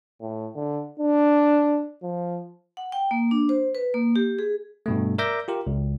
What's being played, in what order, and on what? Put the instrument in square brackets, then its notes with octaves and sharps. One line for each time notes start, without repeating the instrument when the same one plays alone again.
[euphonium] A2
D3
D4
F3
[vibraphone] F#5
G5
A#3
D4
C5
B4
A#3
G4
G#4
[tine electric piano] G2 B2 A3
A#4 D5 E5 D6 G6 A#6
F4 G4 A#4
C#2